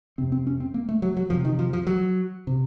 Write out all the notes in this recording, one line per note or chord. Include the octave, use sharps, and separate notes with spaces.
F2 C3 C4
C4
C#4
C4
A#3
A3
F#3
F#3
F2 C3 F3
D#3
F3
F3
F#3
C3